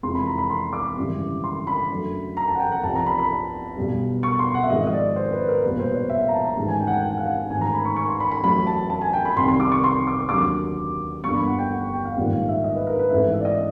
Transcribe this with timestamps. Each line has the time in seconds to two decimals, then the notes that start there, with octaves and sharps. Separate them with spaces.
0.03 F2 C3 E3 G#3 C6
0.15 B5
0.27 A#5
0.38 B5
0.50 C6
0.73 D6
0.97 G#1 F#2 C#3 E3 G3
1.44 C6
1.67 B5
1.90 F#2 D3 F#3 A3
2.37 A#5
2.48 A5
2.55 F#5
2.60 G5
2.72 F#5
2.83 C2 C3 F3 A5
2.96 A#5
3.06 B5
3.19 B5
3.77 B1 B2 G3
4.23 C#6
4.39 C6
4.54 F#5
4.63 E5
4.70 G#1 G#2 F3 G#3 D#5
4.87 D#5
4.93 D5
5.16 C5
5.33 B4
5.48 A#4
5.63 B1 A#2 G3 B4
5.79 C5
5.94 C#5
6.09 E5
6.22 F5
6.28 A#5
6.34 A5
6.44 A#5
6.57 A1 G#2 D#3 G#3 A5
6.68 G#5
6.80 G5
6.87 F#5
6.92 G5
7.03 G5
7.10 F#5
7.17 F5
7.26 F#5
7.50 A1 G#2 D#3 G#5
7.61 A#5
7.74 B5
7.85 C#6
7.96 C#6
8.09 C6
8.20 B5
8.32 B5
8.43 A1 A2 F#3 A3 B5
8.67 A5
8.90 A5
9.01 G#5
9.13 G5
9.25 B5
9.37 C2 C3 D#3 G3 C6
9.48 C6
9.60 D6
9.72 C#6
9.84 C6
10.07 D6
10.29 D#2 D3 F#3 D6
11.23 G1 G2 D3 G3 A#3 C#6
11.35 B5
11.47 F#5
11.59 G5
11.70 F#5
11.93 G5
12.05 F5
12.16 A#1 G#2 D#3 G3 A#3 F#5
12.33 F5
12.49 E5
12.64 D#5
12.76 B4
12.87 A#4
12.99 B4
13.10 A1 G#2 E3 A3 E5
13.34 E5
13.40 D5
13.45 D#5